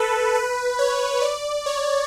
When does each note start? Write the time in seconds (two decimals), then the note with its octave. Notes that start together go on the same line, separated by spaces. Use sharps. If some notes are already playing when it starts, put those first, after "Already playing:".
Already playing: A4 B4
0.35 B4
0.79 C#5
1.22 D5
1.66 C#5